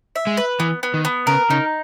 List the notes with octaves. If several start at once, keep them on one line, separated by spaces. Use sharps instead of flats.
E5
G#3
B4
E3 B3
B3
D#3
B3
C#3 A#4
C#3 D#4